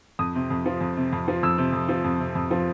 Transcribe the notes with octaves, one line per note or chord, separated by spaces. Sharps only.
F2 D#6
C3
F2
F3
F2
C3
F2
F3
F2 E6
C3
F2
F3
F2
C3
F2
F3